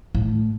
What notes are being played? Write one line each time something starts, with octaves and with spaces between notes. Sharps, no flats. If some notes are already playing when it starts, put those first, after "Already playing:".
A2